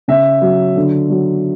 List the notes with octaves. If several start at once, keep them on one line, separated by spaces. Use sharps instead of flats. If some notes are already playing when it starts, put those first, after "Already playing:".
C#3 E5
F#3
D3
F#3